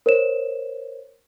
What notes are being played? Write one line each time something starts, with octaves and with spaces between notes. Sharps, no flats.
A#4 C5 C#5 E7